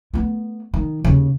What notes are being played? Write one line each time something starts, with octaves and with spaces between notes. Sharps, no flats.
A3 B3
D#3
D#2 C#3